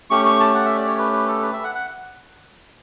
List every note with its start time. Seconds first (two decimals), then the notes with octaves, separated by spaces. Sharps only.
0.10 A3 C#4 G4 C#6
0.25 C#6
0.40 A5
0.54 F#5
0.65 E5
0.76 D5
0.87 C#5
0.98 B4
1.12 B4
1.28 A4
1.42 B4
1.53 E5
1.64 F#5
1.75 F#5